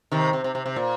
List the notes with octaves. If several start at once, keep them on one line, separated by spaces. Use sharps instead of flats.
C3 D#3
C3
C3
C3
C3
A#2